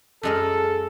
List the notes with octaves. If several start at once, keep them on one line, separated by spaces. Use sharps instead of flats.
F#2 G#3 A4 A#4